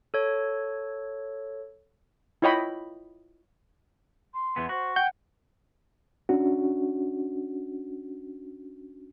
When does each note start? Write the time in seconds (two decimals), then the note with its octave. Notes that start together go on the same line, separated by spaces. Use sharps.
0.14 A4 C#5
2.42 E4 F4 C#5 D#5 G5 B5
4.33 C6
4.56 E2 E3 B3
4.69 F#4 C5
4.96 F#5 G5 G6
6.29 C#4 D4 F#4